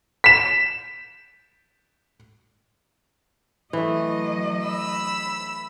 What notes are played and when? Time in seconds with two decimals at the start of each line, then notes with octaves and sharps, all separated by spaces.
0.24 B6 E7
3.73 E3 F#3 A3 D#5
4.66 B5 E6